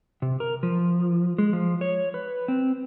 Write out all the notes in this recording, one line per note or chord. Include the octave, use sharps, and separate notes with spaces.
C3
A#4
F3
G#3
F3
C#5
B4
C4